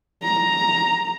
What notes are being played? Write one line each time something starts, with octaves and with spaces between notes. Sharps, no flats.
A#5